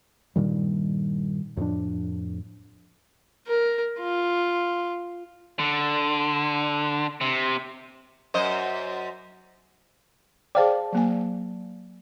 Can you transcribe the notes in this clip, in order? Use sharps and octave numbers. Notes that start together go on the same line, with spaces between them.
G2 A#2 D#3 G3
F2 A2 F3 D4
A#4
F4
D3
C3
F#2 C5 D#5
G#4 C5 D5 F5 G5 A5
F#3 A#3 G#5